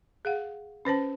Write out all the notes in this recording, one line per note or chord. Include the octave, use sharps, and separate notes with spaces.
G#4 F5 F#5
C#4 B4 C5 A5